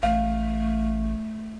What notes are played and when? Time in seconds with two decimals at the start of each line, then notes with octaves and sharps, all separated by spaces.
0.03 A1 A3 F5